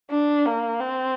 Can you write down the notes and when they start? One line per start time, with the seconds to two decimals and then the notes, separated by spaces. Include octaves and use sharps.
0.11 D4
0.46 A#3
0.80 C4